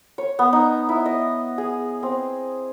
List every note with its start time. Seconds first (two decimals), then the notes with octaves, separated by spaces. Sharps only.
0.18 C#5
0.39 B3
0.53 D#4
0.89 E4
1.06 D#5
1.58 G#4
2.03 C4